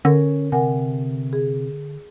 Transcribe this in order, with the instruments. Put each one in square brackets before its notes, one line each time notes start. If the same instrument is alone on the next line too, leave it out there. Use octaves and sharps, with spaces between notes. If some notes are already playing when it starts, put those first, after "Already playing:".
[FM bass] D3 [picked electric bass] C#4 [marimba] A#4
[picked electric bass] C3 [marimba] A#4 F#5 G#5
[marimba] G#4